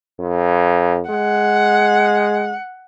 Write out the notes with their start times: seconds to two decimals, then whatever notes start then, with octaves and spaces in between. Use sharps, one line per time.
0.20 F2
1.10 G#3 F#5